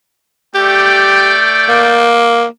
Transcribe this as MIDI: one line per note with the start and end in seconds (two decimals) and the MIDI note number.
0.55 2.16 57
0.55 1.36 67
0.55 2.16 74
0.55 2.16 79
1.69 2.45 58